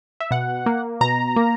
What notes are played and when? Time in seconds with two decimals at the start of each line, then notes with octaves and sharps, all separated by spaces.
0.20 E5
0.31 B2 F#5
0.66 A#3
1.01 B2 A#5
1.36 A#3